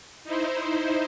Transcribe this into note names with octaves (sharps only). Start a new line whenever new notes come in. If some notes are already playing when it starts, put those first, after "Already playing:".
D#4 E4 C5